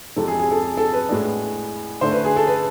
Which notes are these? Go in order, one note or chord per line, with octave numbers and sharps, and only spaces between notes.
F2 C3 G#3 C4 A4
G#4
G#4
A4
G#4
A4
B4
A2 G#3 B3 D4
D3 A3 D4 C5
B4
G#4
A4
B4